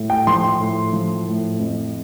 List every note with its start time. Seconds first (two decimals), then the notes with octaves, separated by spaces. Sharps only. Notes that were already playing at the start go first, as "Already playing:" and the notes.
Already playing: A2
0.10 G5
0.27 F3 C6
0.60 A2
0.93 F3
1.27 A2
1.59 F2